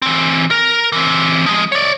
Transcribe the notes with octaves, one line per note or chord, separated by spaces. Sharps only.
E3 C4
A#4
E3 C4
F3 G#3
C#5 D5